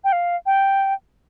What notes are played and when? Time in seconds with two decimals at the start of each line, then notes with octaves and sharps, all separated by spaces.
0.04 G5
0.12 F5
0.46 G5